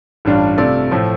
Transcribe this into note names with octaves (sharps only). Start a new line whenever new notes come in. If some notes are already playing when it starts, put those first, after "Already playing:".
A1 G2 G3 D4 F4
C3 A3 F4 D5
A2 F3 A3